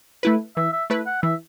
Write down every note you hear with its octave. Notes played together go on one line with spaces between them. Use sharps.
A3 E4 B4
E3 E5
E5
A3 E4 B4
F#5
E3 E5